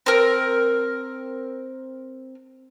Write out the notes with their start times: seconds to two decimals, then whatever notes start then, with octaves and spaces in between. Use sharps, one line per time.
0.06 C4 A#4